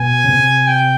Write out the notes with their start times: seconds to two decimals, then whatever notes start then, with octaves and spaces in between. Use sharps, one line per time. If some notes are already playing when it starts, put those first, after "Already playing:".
Already playing: B2 G#5
0.24 C#3
0.29 C3
0.67 G5